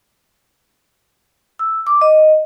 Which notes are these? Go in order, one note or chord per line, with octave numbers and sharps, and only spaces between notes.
E6
D6
D#5